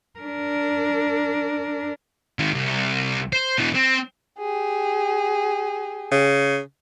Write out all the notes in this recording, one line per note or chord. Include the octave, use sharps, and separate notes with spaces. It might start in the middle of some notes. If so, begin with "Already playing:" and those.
D4 A#4
D#3 G#3
C2
C5
B2 E3
C4
G4 G#4
C#3